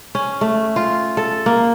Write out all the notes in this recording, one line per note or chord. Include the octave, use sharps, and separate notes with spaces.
C#4
A3
F4
A4
A#3